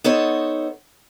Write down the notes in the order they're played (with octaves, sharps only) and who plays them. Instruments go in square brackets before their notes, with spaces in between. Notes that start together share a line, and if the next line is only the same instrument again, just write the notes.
[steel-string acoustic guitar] B3 D#4 A4 C5 C#5